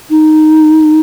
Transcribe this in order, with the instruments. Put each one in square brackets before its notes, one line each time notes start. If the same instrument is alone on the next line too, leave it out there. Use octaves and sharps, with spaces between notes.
[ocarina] D#4